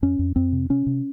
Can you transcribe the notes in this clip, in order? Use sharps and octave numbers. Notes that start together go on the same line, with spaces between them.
F2 C#4
F2
F2 C4
C3
C3 C#4
C3